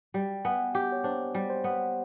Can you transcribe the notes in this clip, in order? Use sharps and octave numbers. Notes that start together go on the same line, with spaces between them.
G3 G5
B3 G#5
G4 F#5
C#5
D4 C5
G3
C5
B3